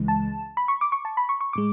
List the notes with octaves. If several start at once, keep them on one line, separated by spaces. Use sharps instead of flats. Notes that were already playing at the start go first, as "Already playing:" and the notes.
Already playing: C#2 C#3 E3 G#3
A5
B5
C#6
D6
C#6
A5
B5
C#6
C#6
A2 G#3 D6